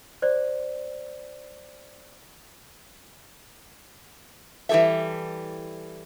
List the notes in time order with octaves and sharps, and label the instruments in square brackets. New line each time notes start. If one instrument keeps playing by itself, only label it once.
[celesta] C5 D5
[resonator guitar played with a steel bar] E3 G3 G#4 A4 E5